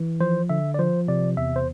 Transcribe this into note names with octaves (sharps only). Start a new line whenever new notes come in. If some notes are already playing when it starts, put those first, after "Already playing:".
Already playing: E3
F3 C5
D3 E5
D5
F3 C5
C3 D5
E2 E5
C5